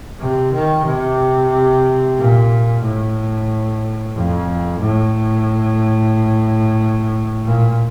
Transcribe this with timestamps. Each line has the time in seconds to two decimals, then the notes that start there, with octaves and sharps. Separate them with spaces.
0.20 C3
0.53 D#3
0.87 C3
2.18 A#2
2.84 A2
4.15 F2
4.81 A2
7.45 A#2